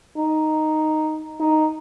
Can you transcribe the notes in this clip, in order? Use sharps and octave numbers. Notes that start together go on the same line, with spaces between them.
D#4
D#4